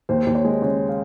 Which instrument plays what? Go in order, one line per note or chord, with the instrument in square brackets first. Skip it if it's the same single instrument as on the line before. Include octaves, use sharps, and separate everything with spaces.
[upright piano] D#2 C5
D#2
C#5
G#3
C#3 C#5
F5